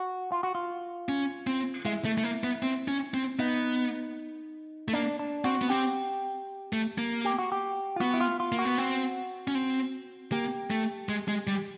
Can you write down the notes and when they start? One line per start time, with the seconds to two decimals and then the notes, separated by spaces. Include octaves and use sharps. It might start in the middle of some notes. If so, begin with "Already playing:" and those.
Already playing: F#4
0.32 F4
0.43 F#4
0.55 F4
1.09 C#4
1.47 C4
1.85 G#3 E4
2.05 A3
2.18 A3
2.24 A#3
2.44 B3
2.63 C4
2.88 C#4
3.14 C4
3.39 B3 D#4
4.88 A3
4.93 A#3 D4
5.19 D4
5.44 C4 F#4
5.62 B3
5.70 C4 G4
6.73 A3
6.98 A#3
7.25 G4
7.38 F#4
7.52 G4
7.96 F4
8.00 B3 F#4
8.14 E4
8.20 F4
8.40 F4
8.52 A#3
8.59 F#4
8.65 B3
8.78 C4
9.48 C#4
9.55 C4
10.32 A#3 G4
10.70 A3
11.09 G#3
11.28 G#3
11.47 G3